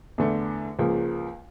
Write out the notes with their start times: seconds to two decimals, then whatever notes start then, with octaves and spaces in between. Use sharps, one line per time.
0.18 E2 D3 A3
0.79 C#2 C#3 F3 A#3